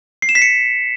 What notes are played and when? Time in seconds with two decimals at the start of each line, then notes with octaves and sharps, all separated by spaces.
0.22 C7
0.29 E7
0.35 B6
0.42 C#7